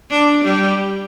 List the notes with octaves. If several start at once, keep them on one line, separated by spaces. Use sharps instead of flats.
D4
G3